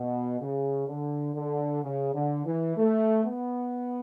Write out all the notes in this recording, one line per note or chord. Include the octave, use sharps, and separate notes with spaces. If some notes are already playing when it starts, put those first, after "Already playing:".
Already playing: B2
C#3
D3
D3
C#3
D3
E3
A3
B3